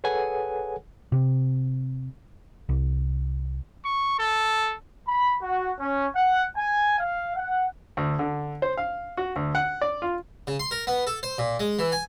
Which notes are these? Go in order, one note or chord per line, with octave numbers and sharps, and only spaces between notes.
G#4 A4 B4 C#5 F#5 G#5
C3
C2
C#6
A4
B5
F#4
C#4
F#5
G#5
F5
F#5
D2
D3
C5
F5
F#4
D2
F#5
D5
F4
C#3
C6
A#4
B3
A4
C5
A#2
G#3
E3
G#5